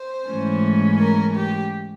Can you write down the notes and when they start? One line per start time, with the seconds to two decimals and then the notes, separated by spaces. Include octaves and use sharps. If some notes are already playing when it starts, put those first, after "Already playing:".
Already playing: C5
0.29 G#2 E3 A3 C#4
1.01 A#4
1.37 G4